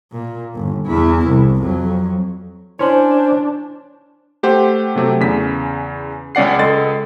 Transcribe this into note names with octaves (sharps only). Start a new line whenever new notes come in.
A#2
G1 D#2
E2 E4
C2
F2 F#3
C#4 D4 E4 C5 C#5 C6 F#7
A3 G4 C5 F#5
C3 F#3 A3 C4
E2 C#3 B6
C#2 C#4 D5 F#5 C7
C#2 A4 D#5 C6 A6